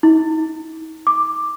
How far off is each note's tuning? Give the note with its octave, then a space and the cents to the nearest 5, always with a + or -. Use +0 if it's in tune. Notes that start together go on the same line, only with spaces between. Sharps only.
D#4 +45
D6 +10